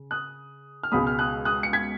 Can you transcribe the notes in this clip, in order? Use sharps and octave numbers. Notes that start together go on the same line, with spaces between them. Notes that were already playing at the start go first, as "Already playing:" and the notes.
Already playing: C#3
D#6 F#6
F6
C#2 B2 G#3 B5 D#6
F6
D#6 F#6
D#6 F#6
C#7
G#6 B6